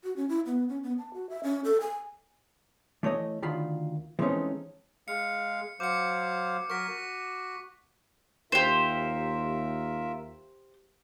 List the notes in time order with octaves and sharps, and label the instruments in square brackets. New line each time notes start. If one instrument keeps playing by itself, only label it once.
[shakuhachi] F#4
C#4
E4
B3
C#4
B3
A5
F#4
E5
C#4
A4
G#5
[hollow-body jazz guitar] E3 A3 C#5 D#5
D2 D#3 F4 B5
E3 G#3 A3 C4 C#4 D#4
[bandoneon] G#3 F5 [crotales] C#7
[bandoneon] F#3 C5 F5 [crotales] D6 C#7
[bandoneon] F#3 A#4 [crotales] C#6 B6
[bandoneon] F#4
[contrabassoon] D#2 [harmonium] F4 A#4 E5 [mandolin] G4 C5